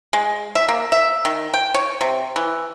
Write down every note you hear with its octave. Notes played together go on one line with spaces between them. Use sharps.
G#3
E5
A#3
E5
D#3
G5
C#5
C3
E3